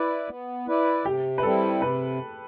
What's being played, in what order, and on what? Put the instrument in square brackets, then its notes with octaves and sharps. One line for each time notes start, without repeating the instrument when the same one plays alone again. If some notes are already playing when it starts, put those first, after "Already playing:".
Already playing: [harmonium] E4 B4 D5
B3
E4 B4 D5
[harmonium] C3 [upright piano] G4
[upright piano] B4
[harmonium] G3 C4 E4 [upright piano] A4
[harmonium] C3 [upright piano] B4